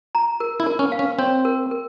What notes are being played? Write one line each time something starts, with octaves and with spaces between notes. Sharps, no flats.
A#5
A#4
E4
A#4
C#4
F5
C#4
C4 C#5
A#4
A#4